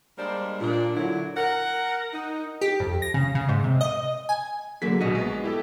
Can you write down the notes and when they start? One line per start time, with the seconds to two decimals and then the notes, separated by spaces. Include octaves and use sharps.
0.18 G3 G#3 A#3 D4 A#4 C5
0.60 A#2 D4
0.96 D3 F#3 E4
1.37 A#4 F#5
2.13 D#4
2.61 G4
2.80 F2
3.02 A#6
3.14 C#3
3.35 C#3
3.49 G#2
3.64 C3
3.81 D#5
4.29 G#5
4.82 D3 F#3 A#3 G#4 B6
5.01 A#1 B2 F#3 F#4 D#5
5.15 G#3 B3
5.44 E4 G4 A4